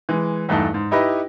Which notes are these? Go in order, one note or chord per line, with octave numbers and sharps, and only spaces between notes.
E3 G#3
E2 G2 A3 D#4 A5
G#2
D#4 E4 G4 B4 D#5